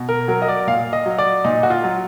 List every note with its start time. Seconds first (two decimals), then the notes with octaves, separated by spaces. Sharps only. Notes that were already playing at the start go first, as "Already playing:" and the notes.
Already playing: B2
0.09 A#4
0.28 F#3 A#4
0.42 D#5
0.48 D5
0.67 A#2 F5
0.93 D#5
1.06 F#3
1.18 D5
1.44 A#2 D#4
1.63 F#4
1.70 F4
1.84 F#3